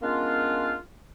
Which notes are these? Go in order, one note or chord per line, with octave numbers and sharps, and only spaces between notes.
G#3 A#3 B3 C#4 D4 F4